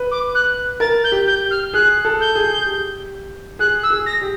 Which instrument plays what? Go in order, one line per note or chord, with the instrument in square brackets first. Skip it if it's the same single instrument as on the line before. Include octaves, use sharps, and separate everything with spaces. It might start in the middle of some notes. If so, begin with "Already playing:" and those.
Already playing: [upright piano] B4
[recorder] D6
F#6
[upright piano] A#4 [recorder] A6
[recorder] G6
[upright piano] G4
[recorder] G6
F6
[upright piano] G#4 [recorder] F#6
[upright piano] A4
[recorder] G6
[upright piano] G#4
G4
[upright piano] G#4 [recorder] F#6
[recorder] E6
[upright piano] G#4
[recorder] A#6
[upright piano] G4